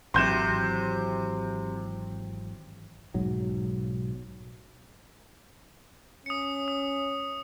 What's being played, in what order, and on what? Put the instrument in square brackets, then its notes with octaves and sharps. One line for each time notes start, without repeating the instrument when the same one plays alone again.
[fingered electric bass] G#1 E3 F#3 [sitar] C3 [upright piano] C6 G6 E7
[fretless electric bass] B1 G#2 F#3
[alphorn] C#4 [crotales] D#6 C#7
[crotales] D#6